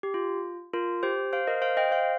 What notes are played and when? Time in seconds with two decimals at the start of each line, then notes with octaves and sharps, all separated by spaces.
0.03 G4
0.14 F4
0.73 F4 A#4
1.03 G4 C5
1.33 C5 F5
1.47 A#4 D#5
1.62 C5 F5
1.77 D#5 G5
1.91 C5 F5